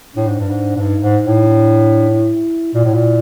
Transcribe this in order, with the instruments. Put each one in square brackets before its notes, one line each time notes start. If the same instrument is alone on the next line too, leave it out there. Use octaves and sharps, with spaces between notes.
[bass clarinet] A2 [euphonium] D4
[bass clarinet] G#2
G2
G#2
G#2
[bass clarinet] G2 [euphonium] D#4
[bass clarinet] G#2
A2
[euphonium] D4
E4
[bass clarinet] A#2 [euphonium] E4
[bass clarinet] A2
A#2